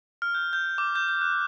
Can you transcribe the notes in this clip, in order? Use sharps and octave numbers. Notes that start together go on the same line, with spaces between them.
F6
G6
G6
D6
G6
G6
F#6